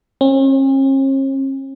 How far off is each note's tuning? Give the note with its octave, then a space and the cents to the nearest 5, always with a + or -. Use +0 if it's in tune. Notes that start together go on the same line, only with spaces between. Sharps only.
C#4 -45